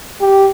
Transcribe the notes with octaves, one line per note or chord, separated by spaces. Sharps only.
G4